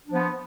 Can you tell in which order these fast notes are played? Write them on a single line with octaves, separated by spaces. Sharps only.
D4 F3 B3